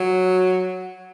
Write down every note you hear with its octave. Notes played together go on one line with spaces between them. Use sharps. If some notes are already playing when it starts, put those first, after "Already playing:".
Already playing: F#3